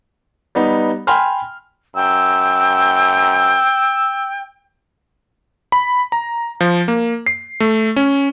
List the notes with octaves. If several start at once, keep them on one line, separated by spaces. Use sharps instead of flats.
G3 B3 D#4
G5 G#5 B5 C6 F6
F#2 G5 E6
B5
A#5
F3
A#3
C7
A3
C#4